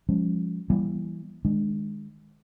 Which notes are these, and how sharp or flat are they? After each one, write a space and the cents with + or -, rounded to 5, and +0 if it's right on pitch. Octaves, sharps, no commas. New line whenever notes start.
F3 +5 G#3 -30 C#4 +0
E3 +10 G3 -5 A#3 +40
D#3 -10 G#3 -5 D4 +20